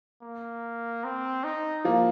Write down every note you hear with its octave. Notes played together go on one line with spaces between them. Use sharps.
A#3
C4
D#4
F3 A#3